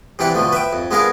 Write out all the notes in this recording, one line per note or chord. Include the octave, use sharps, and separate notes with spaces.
C3 E3 D4 G4 F#5
B2 D3 F3 A3
B4 E5 G5
F2
G#3 B3 D4 A#4 F5 G#5